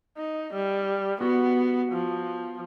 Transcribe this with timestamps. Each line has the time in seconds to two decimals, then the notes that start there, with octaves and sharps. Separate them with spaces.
0.17 D#4
0.53 G3
1.21 B3 F#4
1.93 F3